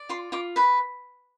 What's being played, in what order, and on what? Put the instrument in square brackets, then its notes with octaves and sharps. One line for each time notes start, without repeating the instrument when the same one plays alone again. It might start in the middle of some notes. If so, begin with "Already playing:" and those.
Already playing: [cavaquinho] D5
F4 C6
F4 D6
B4 B5